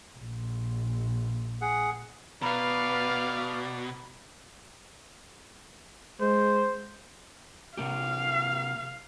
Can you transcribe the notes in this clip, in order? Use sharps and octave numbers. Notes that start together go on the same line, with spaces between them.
A#1
G#4 F#5
B2 B4 D5 F5 A#5 B5
G#3 C5
C3 A#3 G4 F5